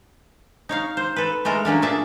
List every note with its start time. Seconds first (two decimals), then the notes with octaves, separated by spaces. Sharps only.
0.69 D#4 C#5 F5
0.97 C5
1.16 A4 B4
1.45 G#3 A3 A4 A#4
1.65 F#3 A#3 C#4 D4
1.82 A#2 C#4 D4 G#4 E5 A5